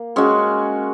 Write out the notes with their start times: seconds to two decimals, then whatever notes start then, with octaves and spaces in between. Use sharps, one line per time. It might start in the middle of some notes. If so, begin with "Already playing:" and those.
Already playing: A#3
0.16 G#3 C#4 F#4